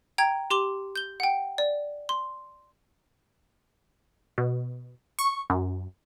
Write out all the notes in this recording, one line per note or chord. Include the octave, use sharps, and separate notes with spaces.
G5 A#5 G#6
G4 C6 D6 F7 G7
G6 G7
F#5 G5
D5
C6
B2
C#6
F#2